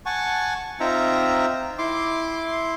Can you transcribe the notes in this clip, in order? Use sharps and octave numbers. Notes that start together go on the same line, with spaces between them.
F#5 G#5 A5 C#6
C4 D#4 F4 E5 G5 A#5
E4 C6 D6